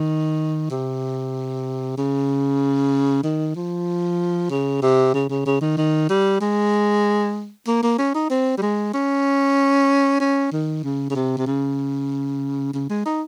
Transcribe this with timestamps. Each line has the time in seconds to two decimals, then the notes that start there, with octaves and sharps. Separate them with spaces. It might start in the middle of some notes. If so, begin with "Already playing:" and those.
Already playing: D#3
0.70 C3
1.98 C#3
3.23 D#3
3.55 F3
4.50 C#3
4.82 C3
5.14 C#3
5.30 C#3
5.46 C#3
5.61 D#3
5.77 D#3
6.09 G3
6.41 G#3
7.67 A#3
7.83 A#3
7.98 C#4
8.14 D#4
8.30 C4
8.58 G3
8.62 G#3
8.94 C#4
10.20 C#4
10.52 D#3
10.84 C#3
11.10 C#3
11.15 C3
11.38 C3
11.47 C#3
12.74 C#3
12.90 G#3
13.05 D#4